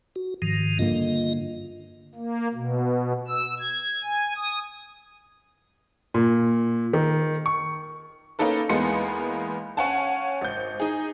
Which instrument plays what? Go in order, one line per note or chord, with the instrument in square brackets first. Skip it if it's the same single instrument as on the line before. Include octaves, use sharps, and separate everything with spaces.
[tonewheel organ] F#4
G#2 D#3 F3
[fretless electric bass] G2 D3 A#3 [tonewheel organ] F4 D#5
[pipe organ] A#3
B2
E6
G#6
G#5
D#6
[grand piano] A#2
D#3
C#6
[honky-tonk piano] A#3 C#4 D#4 A4 B4
E2 G#3 A#3 B3 C6 C#7
C#4 C#5 F5 F#5 G#5 A5
G#1 G6
D#4 G#4